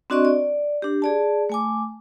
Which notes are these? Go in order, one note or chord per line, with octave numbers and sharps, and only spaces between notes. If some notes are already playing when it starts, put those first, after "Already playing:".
C4 D4 F#4 D5 D#5 C#6
D5
D4 G4
G#4 D5 A5
A3 G#5 D6